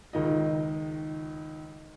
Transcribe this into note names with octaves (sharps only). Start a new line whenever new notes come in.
C#2 D#3 D#5